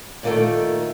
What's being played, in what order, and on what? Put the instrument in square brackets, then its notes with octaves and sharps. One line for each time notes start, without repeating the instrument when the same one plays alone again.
[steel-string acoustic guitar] A#2 D#3 A3